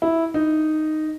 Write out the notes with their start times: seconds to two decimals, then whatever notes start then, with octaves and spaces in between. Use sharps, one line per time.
0.02 E4
0.34 D#4